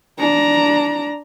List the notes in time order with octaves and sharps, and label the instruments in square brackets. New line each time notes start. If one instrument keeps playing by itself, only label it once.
[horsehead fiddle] D4 A#5